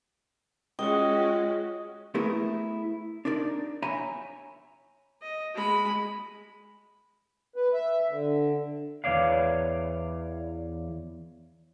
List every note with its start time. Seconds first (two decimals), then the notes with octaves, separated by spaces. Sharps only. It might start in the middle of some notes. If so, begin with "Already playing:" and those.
0.79 G#3 C#4 F4 F#4 D#5 G5
2.14 A3 B3 E4 G#4 A#4
3.25 D4 D#4 A#4 D5
3.82 C#5 E5 G#5 A#5 B5
5.22 D#5
5.54 G#3 B5
7.56 B4
7.73 E5
8.09 D3
9.04 E2 G3 C#5 D5 F5